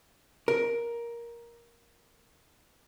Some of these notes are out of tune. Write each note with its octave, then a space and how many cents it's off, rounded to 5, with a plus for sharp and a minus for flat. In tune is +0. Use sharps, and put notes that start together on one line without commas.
A#4 +10